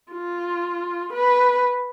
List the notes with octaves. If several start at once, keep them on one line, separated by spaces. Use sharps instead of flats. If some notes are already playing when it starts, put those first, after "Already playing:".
F4
B4